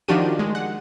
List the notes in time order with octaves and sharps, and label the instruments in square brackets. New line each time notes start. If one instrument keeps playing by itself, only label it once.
[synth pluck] D#3 F3 D4 F#4 G4 D#7
G#3
F#5